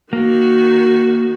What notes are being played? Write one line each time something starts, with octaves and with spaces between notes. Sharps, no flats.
D#3 A#3 F#4